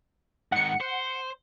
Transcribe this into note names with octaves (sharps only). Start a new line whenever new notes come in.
G#2 D#3 F#5 C#7
C5